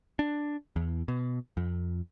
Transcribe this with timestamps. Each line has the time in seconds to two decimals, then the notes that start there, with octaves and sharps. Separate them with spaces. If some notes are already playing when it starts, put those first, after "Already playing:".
0.19 D4
0.76 E2
1.08 B2
1.57 F2